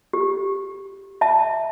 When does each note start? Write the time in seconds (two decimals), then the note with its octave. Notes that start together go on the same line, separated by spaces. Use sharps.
0.13 G4
1.21 E5 A5